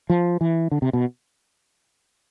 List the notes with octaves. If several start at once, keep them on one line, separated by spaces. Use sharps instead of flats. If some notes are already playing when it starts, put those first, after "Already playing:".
F3
E3
D3
C3
B2